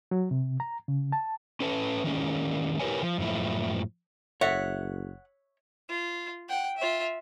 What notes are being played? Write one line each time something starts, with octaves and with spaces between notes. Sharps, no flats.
F#3
C3
A#5
C#3
A5
C#4 A4 B4 A5
D#3 E3 G#3 A#3 C#4
E4 G4 A#4 B4 C#5 G#5
F3
F#2 A2 F3 E4
F#1 C#5 E5 F#5
F4
F#5 G5
F4 E5